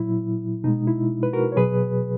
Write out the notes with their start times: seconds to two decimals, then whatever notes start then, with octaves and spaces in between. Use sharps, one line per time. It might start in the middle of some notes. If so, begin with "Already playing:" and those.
Already playing: A#2 F#3 E4
0.64 B2 G#3 D#4
0.87 E4
1.23 B4
1.33 F#4 A#4
1.52 C#5
1.57 B2 F#3 G#4 B4